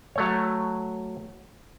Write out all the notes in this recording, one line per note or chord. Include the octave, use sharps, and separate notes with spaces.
F#3 A3 C#5